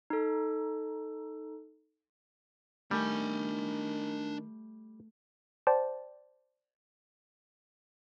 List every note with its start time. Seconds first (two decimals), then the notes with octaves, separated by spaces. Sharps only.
0.10 D#4 A4
2.91 D#3 G3 A3 D4 G#5
5.67 C5 D5 G5 A5